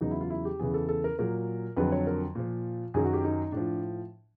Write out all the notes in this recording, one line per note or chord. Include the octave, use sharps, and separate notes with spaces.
E2 C#3 F#3 D#4
E4
F4
E4
G4
E2 C#3 E3 G#4
A4
A4
A#4
A#2 F#3 A#4
F2 D3 F#3 B4
C#5
A#4
A#2 F3
F#2 D#3 F#3 G#4
F#4
G4
D#4
A2 F3 D4